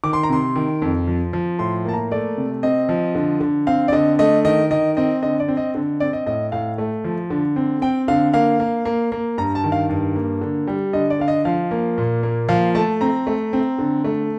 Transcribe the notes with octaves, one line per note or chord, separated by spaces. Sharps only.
D#3 D6
C6
A#5
C3 C6
D#3
F2
F3
F3
A2 C6
A#3 A5
A#5
A3 D5
C3
C4 D#5
F3
D3
D3
C4 F5
D5
D3 D#5
A3 D#5
D#3 D#5
D#3 D#5
C4 D#5
D3 D#5
D5
C4
D#5
D3
C4 D5
D#5
A2 D#5
A2 F5
A3
F3
D3
C4
C4 G5
D3 F5
A#3 F5
A#3
A#3
A#3
G2 A#5
A5
D#3
F5
G2
A#3
D3
G3
D3 D#5
D5
D3 F5
D#5
F3 F5
A#3
A#2
A#3
F3 F5
A3 A5
C4 A#5
A3
C4
D3
A3